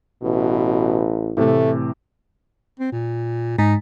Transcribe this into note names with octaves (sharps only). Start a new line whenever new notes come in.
A1 B2
A2 C3 E3 A3
C4
A#2
G#2 D#4